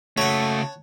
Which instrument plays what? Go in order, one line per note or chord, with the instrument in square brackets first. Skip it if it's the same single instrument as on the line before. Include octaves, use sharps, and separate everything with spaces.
[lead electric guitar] C#3 F#4 [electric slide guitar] A3 [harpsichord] C#5 F#5 [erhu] A5